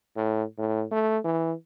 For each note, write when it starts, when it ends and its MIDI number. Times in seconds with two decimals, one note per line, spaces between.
0.16 0.43 45
0.58 0.85 45
0.91 1.18 57
1.24 1.53 52